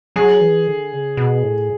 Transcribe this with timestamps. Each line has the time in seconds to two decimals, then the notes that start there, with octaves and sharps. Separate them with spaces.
0.16 F#3 G#4
0.41 E3
0.67 D3
0.93 C#3
1.17 B2
1.43 A2